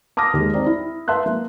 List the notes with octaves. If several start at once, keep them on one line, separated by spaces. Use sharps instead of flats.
A5 D6 D#6 F6 A#6
D#2 G#3
C4 D#4 D5
E4
B4 E5 A5 C6 F#6
A#3